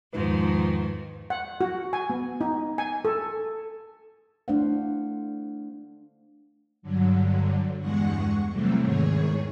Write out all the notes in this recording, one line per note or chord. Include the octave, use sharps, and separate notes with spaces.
E2 G#2 D#3 F3 D#4 B4
F#5
F#4
G#5
B3
D#4
G#5
A4
A3 D4 E4 C5 F5 F#5
G2 D3 F#3
E2 G2 G#3 F#5 C#6
C3 E3 F#3 G3 A3 C4
E2 G#2 D#3 G#4 C#5